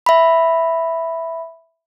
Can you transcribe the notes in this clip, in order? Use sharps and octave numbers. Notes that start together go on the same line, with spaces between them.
E5 B5